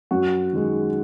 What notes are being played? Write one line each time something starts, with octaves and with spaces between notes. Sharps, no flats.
F#2 F#4
D#3 G#3